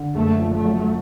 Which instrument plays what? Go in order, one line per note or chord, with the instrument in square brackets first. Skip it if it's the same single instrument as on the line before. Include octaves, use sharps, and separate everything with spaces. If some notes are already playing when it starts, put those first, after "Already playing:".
Already playing: [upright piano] D3
[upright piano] F#1 [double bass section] A3
[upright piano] F3
[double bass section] A3
[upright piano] F#2